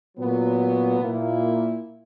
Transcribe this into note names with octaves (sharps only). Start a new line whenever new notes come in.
A#2 F#3 B3
A#2 A#3 E4